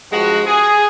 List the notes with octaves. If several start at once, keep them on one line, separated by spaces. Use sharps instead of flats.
G2 F3 G#3 F#4
G#4